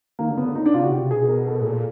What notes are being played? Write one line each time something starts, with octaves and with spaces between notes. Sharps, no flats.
D#3 A#3
D3 A#3
C#3 B3
D3
C#3 D#4
D4
C3 F4
C#3 F#4
C3 G4
B2 G#4
A#4
A4
A2 G#4
A#2 A4